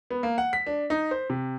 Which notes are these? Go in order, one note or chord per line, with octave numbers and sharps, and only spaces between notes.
B3
A#3
F#5
B6
D4
D#4
C5
C3